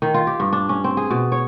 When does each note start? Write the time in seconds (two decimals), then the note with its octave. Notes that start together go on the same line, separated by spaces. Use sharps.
0.02 D#3
0.14 F4
0.27 G4
0.40 G2
0.53 D4
0.69 C#4
0.84 C4
0.97 G#4
1.11 B2
1.32 C#5